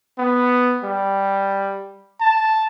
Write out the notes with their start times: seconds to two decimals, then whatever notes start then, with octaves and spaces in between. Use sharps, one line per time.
0.19 B3
0.84 G3
2.20 A5